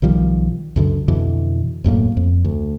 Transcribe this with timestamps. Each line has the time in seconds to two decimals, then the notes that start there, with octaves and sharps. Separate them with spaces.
0.02 B1 D#3 F3 G3
0.76 C#2 F#2 D3
1.08 F2 B2 D3 E3
1.84 E1 F#2 A2 A#3
2.17 F2
2.45 D2